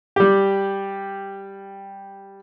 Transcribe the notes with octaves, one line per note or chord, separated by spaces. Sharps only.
G3 G4